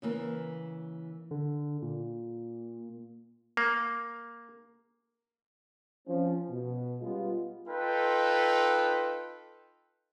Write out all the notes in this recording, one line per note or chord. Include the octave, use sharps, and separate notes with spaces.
C#3 E3 A#3
D3
A#2
A#3
F3 C4 C#4
B2
G3 G#3 B3 C#4 F4
D#4 F4 A4 B4 G5